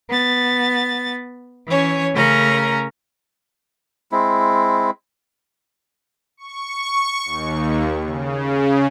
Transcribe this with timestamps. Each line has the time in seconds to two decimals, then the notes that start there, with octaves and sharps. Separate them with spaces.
0.10 B3 A6
1.68 E3 C#4 C#5
2.14 C#3 A3 C#4 A#4 A#5
4.12 G#3 C4 E4
6.37 C#6
7.25 D#2
8.03 C#3